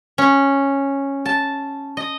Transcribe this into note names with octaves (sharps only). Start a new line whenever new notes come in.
C#4
A5
D#5